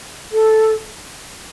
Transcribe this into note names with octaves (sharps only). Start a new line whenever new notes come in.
A4